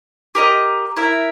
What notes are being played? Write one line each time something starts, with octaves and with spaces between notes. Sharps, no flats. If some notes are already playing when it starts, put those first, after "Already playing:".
G4 A#4 D#5
E4 A#4 E5